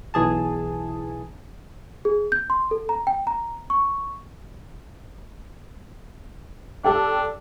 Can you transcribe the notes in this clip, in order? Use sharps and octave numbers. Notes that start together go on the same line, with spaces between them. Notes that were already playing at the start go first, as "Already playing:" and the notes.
B1 E3 G#4 A5
G#4
G6
C6
A4
A#5
G5
A#5
C#6
D4 G4 A4 G5